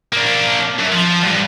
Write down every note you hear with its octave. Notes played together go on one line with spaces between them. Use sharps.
A#3 D4
F#2
F3
E2 G2